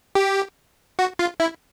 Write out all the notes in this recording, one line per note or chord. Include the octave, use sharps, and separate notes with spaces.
G4
F#4
F4
E4